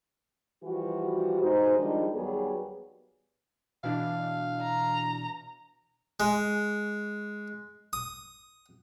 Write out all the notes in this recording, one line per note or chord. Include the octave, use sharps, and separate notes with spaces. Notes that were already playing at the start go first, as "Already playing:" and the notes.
E3 F3 G3 F#4
B2 G#3 D#4 C5
D#3 F3 G3 G#3 D4 D#4
D#2 F#3 G3 B3 G#4
B2 E3 D4 F5
A#5
G#3
D#6